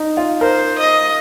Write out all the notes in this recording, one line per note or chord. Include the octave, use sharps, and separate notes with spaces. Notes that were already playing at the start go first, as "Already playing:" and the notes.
Already playing: D#4
F4
A#4 C5
D#5